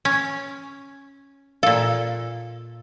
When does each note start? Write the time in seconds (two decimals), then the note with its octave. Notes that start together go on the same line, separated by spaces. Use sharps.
0.05 C#4
1.63 A#2 A4 F5